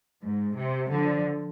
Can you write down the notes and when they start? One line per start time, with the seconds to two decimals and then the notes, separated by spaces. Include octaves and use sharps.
0.23 G#2
0.57 C3
0.90 D3 F3